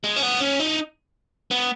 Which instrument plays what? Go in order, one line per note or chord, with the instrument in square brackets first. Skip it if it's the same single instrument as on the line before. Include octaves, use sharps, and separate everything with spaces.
[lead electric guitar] G#3
C#4
B3
C#4
D#4
B3